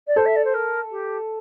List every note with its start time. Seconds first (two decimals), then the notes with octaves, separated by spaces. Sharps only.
0.07 D5
0.16 A4 C5
0.25 E5
0.36 D5
0.44 C5
0.54 A#4
0.91 G4